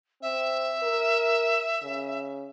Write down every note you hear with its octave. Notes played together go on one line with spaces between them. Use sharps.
C4 E5
A#4
C#3